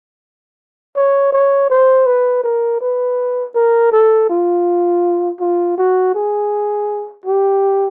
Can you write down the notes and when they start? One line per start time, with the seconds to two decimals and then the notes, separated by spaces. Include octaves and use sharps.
0.96 C#5
1.32 C#5
1.70 C5
2.06 B4
2.43 A#4
2.81 B4
3.55 A#4
3.92 A4
4.29 F4
5.40 F4
5.78 F#4
6.15 G#4
7.25 G4